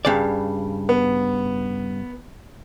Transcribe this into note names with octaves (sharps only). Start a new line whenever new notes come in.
G2 C#3 D5
B3